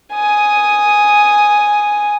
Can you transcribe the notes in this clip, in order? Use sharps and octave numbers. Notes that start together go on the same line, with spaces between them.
G#5 D#6